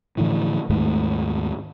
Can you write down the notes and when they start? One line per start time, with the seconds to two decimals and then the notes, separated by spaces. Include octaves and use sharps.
0.17 A2 D3 E3 F3
0.70 D#2 G#2 D#3 A3